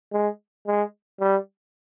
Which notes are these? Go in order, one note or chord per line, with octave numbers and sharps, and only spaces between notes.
G#3
G#3
G3